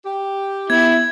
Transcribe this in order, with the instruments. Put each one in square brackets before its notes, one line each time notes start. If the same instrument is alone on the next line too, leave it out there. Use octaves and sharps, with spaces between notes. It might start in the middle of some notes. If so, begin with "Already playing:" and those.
[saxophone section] G4
[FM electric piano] B3 [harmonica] E4 [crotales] G#6